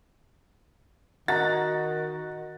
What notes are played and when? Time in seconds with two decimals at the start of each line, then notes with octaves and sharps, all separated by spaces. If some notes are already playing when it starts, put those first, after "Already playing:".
1.28 D#3 F#4 D#5 A#5 F#6 A6